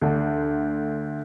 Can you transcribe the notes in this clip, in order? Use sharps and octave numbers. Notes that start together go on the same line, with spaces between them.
D2 D4